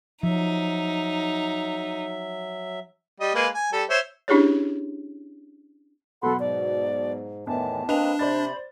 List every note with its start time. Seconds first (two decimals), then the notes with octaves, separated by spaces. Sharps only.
0.23 F3 F#3 D#4 E5
3.20 G3 D#5
3.35 G#3 A#3 B4
3.54 G#5
3.73 G3 A4
3.89 C5 C#5 E5
4.28 C#4 D4 E4 G4 G#4 C#5
6.23 B2 F#3 A4 F#5 B5 C6
6.40 G#2 D5
7.47 E2 A2 D#3 E3 A5
7.89 A#3 C4 D4 B4 D#5 F7
8.19 C3 C5 D5 B5 A6